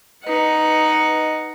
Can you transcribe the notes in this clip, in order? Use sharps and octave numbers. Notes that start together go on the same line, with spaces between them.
D#4 B4 D#5 F#5